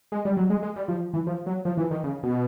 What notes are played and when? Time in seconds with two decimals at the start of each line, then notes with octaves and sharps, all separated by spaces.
0.12 G#3
0.25 G3
0.37 F#3
0.50 G#3
0.63 G#3
0.76 G3
0.88 F3
1.14 E3
1.27 F3
1.46 F#3
1.65 F3
1.77 E3
1.91 D#3
2.04 C#3
2.23 B2